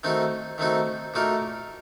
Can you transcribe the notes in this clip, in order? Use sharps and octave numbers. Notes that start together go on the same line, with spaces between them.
D#3 A3 C4 D#4 F#4
D#3 A3 C4 D#4 F#4
A#2 A3 D#4 F#4 A#4